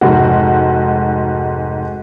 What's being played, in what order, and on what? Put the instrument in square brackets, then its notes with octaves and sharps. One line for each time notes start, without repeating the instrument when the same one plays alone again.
[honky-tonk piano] F1 G#2 F#4